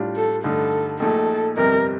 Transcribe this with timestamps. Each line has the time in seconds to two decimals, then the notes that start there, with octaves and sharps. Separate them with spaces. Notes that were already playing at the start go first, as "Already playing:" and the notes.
Already playing: A2 G3 D4 F4
0.16 A4
0.43 G2 D3 A3 D#4 A4
1.00 A#1 A#2 A3 D#4 A4
1.56 G1 F2 C3 G3 A#4